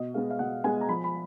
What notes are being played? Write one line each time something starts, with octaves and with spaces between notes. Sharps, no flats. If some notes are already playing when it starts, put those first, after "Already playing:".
Already playing: B2 D#5
G#3 B3 F5
F5
B2 F#5
G#3 B3 G#5
A#5
F3 B5
B5